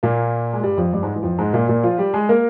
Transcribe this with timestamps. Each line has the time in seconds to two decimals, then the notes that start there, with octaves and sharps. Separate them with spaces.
0.03 A#2 A#3
0.53 G#3
0.63 G2 G3
0.78 F2 F3
0.93 G2 G3
1.03 G#2 G#3
1.16 E3
1.23 F2 F3
1.39 G#2 G#3
1.53 A#2 A#3
1.68 A#2 A#3
1.83 F3 F4
1.98 G3 G4
2.14 G#3 G#4
2.29 A#3 A#4